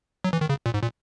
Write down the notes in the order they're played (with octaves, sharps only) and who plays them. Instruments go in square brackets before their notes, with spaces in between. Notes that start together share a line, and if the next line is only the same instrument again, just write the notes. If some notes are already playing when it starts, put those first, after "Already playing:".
[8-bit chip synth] F#3
E3
D#3
C#3
A#2
G#2
A#2